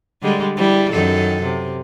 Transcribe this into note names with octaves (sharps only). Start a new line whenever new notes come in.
D3 G3 G#3
G3 E4
F#2 D#3 A4
C3